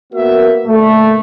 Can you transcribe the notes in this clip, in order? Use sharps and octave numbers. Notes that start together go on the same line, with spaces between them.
A#3 B3 F#4 A#4 E5
A#2 D3 A3